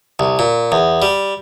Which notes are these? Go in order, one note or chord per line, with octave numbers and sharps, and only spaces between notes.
C2
A#2
E2
G3